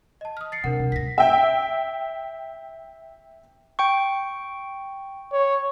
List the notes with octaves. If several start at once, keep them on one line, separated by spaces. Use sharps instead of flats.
D#5 A5
D#6 F6
A6 C7 C#7
C3 E3 D4 A#4 F#5
C2
D2 G#2 A#6 B6
E5 G5
G5 C#6
C#5